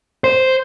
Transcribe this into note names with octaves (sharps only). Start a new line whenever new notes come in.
C5